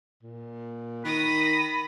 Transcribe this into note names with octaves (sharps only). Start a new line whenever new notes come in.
A#2
D#3 B5 D#6 A#6